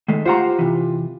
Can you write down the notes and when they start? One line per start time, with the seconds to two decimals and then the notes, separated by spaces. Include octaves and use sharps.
0.08 D#3 G#3 A3
0.25 F4 G4 C5 F#5 A#5 C6
0.59 C3 E3